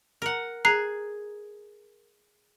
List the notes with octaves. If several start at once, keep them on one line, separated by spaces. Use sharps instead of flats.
A#4 F#5
G#4 A#5 F#6 C7